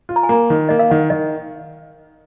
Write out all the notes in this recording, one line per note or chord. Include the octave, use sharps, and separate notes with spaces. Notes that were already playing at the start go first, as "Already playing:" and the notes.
F4
A#5
G#5
A#3 A#5
D#3
A#3 D#5
F5
D#3 F#5
D#3 D#5